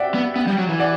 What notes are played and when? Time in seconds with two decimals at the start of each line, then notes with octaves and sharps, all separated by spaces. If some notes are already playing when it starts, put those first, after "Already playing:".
Already playing: D5 E5 F#5 G5
0.15 B3
0.36 B3
0.47 G3
0.58 F#3
0.69 E3
0.79 D5 F#5